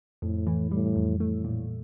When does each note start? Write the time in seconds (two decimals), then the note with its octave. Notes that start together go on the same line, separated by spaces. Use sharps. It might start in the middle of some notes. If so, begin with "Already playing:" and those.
0.22 F2 A2
0.47 E3
0.71 A2 G3
0.96 F2
1.20 A2 A3
1.44 A#2